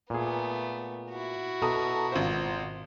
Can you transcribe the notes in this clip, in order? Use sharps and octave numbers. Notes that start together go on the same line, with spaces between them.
A#2 A3 B3 G#4
E4 F#4
B2 A4 A#5 D#6
G#1 F4 C5